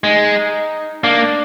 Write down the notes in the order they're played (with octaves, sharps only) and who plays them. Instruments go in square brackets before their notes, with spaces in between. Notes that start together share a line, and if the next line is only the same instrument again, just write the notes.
[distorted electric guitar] G#3 [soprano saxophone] D#4
[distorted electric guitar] A#3 [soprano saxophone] D4